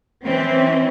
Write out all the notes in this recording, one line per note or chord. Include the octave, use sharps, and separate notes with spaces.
E3 C4 C#4